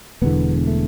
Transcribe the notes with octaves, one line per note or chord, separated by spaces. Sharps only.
E1 E2 D3 B3
A3